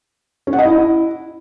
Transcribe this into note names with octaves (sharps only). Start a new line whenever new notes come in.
C#4
F#5
D#5
E4